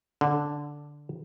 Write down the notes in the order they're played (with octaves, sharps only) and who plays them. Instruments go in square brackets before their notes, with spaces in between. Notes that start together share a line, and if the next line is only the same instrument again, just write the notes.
[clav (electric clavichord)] D3